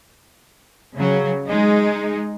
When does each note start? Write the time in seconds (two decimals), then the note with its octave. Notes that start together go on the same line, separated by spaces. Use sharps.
0.97 C#3 F#3
1.46 G#3 D#4